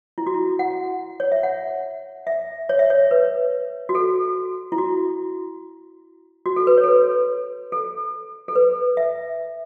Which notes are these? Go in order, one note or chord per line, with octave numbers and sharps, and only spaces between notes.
E4
F#4
E4
F#5
C#5
E5
F#5
E5
C#5
E5
C#5
B4
F#4
A4
E4
F#4
F#4
A4
B4
C#5
A4
B4
A4
A4
B4
E5